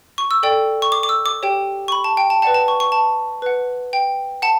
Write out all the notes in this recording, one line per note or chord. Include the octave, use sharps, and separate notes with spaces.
C#6
E6
A4 D5 G5
C#6
D6
D6
E6
D6
G4 C#5 G5
C#6
B5
A5
G5
A5
B4 D5 F#5 A5
A5
C#6
C#6
A5
B4 F#5
G5
F#5 A5